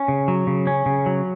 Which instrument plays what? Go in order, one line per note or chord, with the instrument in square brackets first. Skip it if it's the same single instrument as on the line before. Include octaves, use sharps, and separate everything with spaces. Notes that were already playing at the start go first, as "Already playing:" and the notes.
Already playing: [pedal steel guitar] C#4
C#3
F#3
C#3
C#4
C#3
F#3